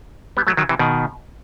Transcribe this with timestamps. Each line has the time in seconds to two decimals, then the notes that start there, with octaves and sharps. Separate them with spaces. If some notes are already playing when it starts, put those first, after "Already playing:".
0.37 G3 B3
0.47 F#3 A3
0.57 D#3 F#3
0.69 C3 E3
0.79 B2 D#3